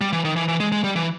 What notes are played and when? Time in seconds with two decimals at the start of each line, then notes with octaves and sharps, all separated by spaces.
0.01 G3
0.13 E3
0.25 D#3
0.36 E3
0.48 E3
0.60 G#3
0.72 G#3
0.84 G3
0.96 E3